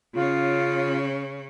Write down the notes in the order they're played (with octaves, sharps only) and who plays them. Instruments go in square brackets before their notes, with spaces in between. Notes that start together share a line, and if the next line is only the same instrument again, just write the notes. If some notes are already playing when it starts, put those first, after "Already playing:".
[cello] C#3 C#4 [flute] F4